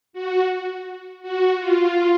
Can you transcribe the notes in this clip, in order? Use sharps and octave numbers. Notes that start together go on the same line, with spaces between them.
F#4
F#4
F4